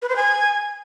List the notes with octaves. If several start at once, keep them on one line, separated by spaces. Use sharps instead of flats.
B4
C5
G#5